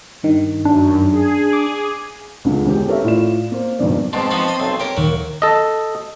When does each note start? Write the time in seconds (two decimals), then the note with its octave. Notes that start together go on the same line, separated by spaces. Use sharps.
0.23 G2 D#3
0.65 F#2 D4
1.12 G#4
1.53 D6
2.44 C#2 D3 G#3
2.65 E1 G#3 C#4 G4
2.87 G4 A4 A#4 C#5 E5
3.04 A2 F4 D5 E7
3.52 A#3 C5
3.79 F1 G2 B2 D#3 D5
4.13 G#2 B2 C4 A5 C6
4.31 F3 B3 D#4 C#6
4.48 D#5
4.60 B1 C5 E5
4.80 G4 A#4 C#5 C#7
4.97 D#2 A#2 D#3 F#3
5.42 A4 D#5